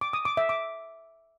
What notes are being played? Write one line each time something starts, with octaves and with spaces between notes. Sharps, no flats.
D6
D#6
D6
E5
D6